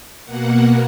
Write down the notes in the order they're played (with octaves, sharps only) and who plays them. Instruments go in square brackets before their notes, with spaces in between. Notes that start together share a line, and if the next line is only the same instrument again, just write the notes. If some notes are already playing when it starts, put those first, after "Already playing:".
[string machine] B2 A#3 F#5